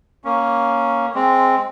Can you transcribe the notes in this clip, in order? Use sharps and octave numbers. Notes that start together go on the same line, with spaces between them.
A#3 C#4
G#3 C4